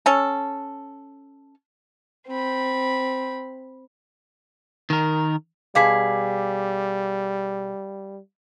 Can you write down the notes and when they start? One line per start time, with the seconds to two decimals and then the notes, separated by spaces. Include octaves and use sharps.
0.06 C#4 A4
2.27 C4 B5
4.90 D#3 A#4
5.75 B2 G3 G#4 F5 D6 B6